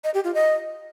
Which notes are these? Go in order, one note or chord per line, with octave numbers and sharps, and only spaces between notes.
D#5
G4
F4
D#5